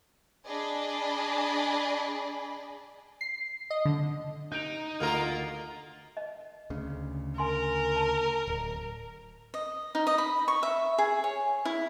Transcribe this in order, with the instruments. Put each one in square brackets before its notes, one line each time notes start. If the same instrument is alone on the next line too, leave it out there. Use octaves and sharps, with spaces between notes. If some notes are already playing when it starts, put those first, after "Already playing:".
[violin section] D4 G#4 D5 D#5 G#5 B5
[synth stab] C7
D#5
D3
[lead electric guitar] D#4 [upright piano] G6 D7 F7
[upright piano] D2 F6 [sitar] A#3 F4 A#4
[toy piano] D#5
[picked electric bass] D2 C#3
[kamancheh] A#4 [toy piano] G#5 C6
[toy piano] A5
[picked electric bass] D1
[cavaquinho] D#5
D#4
D#5
B5
C#6
E5
G#4
C#5
E4